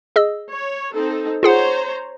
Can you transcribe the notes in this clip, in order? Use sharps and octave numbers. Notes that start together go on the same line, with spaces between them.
G#4 D#5 E6
C#5
C4 D#4 A4
F4 G#4 C5 C#5 F#5 A#5